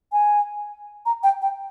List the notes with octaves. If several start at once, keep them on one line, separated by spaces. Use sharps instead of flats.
G#5
A#5
G5
G5